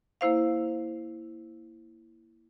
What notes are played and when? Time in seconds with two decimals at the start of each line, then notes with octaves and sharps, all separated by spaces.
0.21 A#3 E4 C5 F5